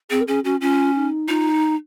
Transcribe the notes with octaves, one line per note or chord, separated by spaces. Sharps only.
C4 G#4
A#4
C#4 G#4
C#4 F#4
C#4 F4
D#4
D#4 F4